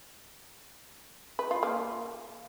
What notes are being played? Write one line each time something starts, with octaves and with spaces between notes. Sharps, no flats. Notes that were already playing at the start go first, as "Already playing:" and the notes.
B4
F4
A#3